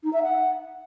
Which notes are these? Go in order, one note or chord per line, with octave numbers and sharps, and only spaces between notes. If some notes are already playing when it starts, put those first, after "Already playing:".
D#4
E5
F#5